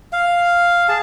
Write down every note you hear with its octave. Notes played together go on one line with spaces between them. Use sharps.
F5
G#4 A5